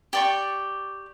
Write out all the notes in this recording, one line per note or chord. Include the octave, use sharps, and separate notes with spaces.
G4 D5 C#6